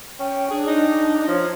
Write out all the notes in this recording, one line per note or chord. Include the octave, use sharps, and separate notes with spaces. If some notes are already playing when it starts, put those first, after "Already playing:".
C#4 G5
D4 G#4
D#4
F3 C#5